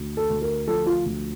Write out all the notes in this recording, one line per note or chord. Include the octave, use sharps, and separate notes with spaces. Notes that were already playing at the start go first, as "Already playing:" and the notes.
Already playing: D2
A4
D2
A#4
F3 A4
F4
D2